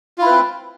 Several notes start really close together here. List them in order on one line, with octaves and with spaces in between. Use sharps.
F4 E4 B4 C4